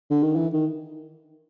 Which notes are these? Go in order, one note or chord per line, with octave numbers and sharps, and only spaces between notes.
D3
D#3
E3
D#3